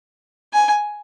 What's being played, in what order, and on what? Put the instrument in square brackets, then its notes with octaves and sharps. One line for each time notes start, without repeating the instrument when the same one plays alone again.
[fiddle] G#5